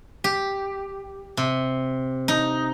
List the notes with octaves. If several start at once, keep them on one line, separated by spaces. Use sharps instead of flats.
G4
C3
D#4